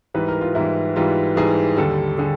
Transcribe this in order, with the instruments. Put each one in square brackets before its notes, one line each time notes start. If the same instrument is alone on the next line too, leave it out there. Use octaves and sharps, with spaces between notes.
[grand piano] G#2 E3 G3 B4
A#4
F4
G#2 E3 G3 E4
G#2 E3 G3 F4
G#2 E3 G3 G#4
D#2 D3 G3 A4
D3 G3 G#4